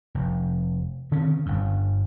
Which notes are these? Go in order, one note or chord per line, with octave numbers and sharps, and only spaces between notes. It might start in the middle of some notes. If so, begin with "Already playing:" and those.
F1
D3 D#3 C4 C#4
G1 G2